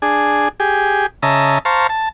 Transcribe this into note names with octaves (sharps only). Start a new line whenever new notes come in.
D4 G#4
G4 G#4
C#3 D#5 E5 A5 A#5
C5 F5 A5 A#5 C#6
A5